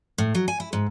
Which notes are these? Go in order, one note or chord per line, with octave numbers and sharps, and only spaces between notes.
A2
F#3
G#5
E4
G#2